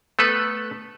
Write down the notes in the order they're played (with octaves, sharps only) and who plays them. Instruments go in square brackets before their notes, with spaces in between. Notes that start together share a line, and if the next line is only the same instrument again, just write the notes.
[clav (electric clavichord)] A3 B3 A4 B4